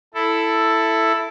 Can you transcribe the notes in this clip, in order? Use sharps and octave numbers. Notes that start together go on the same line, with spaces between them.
E4 A4